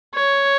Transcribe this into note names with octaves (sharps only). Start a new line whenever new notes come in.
C#5